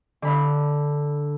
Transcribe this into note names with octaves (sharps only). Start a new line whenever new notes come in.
D3 B5